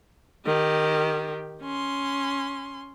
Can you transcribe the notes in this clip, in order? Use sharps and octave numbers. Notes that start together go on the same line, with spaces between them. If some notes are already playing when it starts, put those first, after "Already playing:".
D#3 G4
C#4 C6